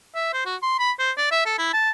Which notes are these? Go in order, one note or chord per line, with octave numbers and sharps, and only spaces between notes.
E5
C5
F#4
C6
B5
C5
D5
E5
A4
E4
A5